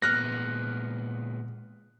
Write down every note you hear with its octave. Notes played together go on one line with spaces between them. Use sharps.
A#2 G#3 B3 F6 F#6 A#6